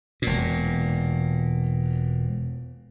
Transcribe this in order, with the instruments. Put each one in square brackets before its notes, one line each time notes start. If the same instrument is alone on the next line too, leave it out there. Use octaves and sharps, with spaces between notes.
[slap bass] E1 A#2